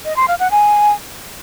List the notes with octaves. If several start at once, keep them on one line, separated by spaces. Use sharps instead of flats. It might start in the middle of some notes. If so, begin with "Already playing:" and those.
D#5
C6
F5
F#5
G#5